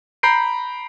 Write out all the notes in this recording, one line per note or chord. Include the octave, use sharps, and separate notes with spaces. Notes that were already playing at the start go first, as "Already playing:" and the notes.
A#5 B5 G6 C7 D7